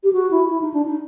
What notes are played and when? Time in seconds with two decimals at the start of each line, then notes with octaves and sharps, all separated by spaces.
0.04 G4
0.13 F#4
0.31 E4
0.49 E4
0.62 D#4
0.74 D4
0.86 D#4